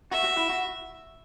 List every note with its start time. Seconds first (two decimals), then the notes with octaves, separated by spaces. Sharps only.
0.11 F#4 E5
0.24 F#4
0.37 E4
0.49 F#4